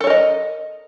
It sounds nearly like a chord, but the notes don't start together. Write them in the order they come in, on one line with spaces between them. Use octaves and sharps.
A4 C#5 A#4 D#5